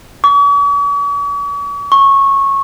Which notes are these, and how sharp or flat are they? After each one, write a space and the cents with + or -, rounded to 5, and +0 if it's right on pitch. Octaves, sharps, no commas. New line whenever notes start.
C#6 +45
C#6 -15